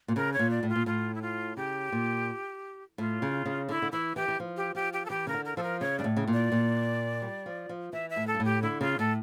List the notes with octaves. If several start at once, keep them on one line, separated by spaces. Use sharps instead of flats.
A#2
C#3 A#4
C#5
A#2
D5
A2
F4
A#2
A2 F4
E4
F4
C#3 G4
A#2
A2 F4
C#3
C#3
D3 E4
D3
E3 E4
E3 G4
E3
F3
G4
F3 G4
G4
A4
E3 G4
C#3 A#4
D3
A#4
F3 A4
A#4
C#3 C#5
G2 D5
A2
C#3
A#2
D5
A#2
G3
F3
F3
E3 E5
E5
A2
A4
G2
A2
G4
D3 E4
C#3 F4
A2 A4